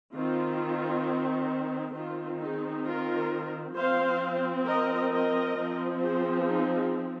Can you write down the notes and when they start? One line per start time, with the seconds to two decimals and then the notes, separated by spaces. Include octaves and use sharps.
0.14 D#3 C4 F4
1.95 D#3 C4 F4
2.40 D#4 G#4
2.85 F4 A#4
3.76 F3 C4 C5 F5
4.67 A#4 D#5
5.12 A#4 D#5
5.57 F3 C4
6.02 G#4 C5
6.48 D#4 G#4